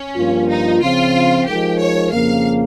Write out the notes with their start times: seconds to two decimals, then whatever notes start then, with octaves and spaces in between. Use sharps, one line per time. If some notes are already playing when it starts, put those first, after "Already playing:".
Already playing: C#4
0.15 G2 F3 A#3 F4
0.49 D#4
0.81 C#3 F3 C4 F4
1.46 F3 G#3 D#4 G4 A#4
1.80 C#5
2.12 F2 C#3 F3 A#3 F5